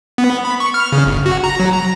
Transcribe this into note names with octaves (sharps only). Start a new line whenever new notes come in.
B3
B5
C#6
F6
C#3
G1
F#4
A#5
F#3
A#5